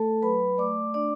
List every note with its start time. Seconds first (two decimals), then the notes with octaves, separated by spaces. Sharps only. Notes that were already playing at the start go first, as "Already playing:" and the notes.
Already playing: A3 A4 A5
0.22 F#3 B4 B5
0.58 A3 D5 D6
0.94 D4 D5 D6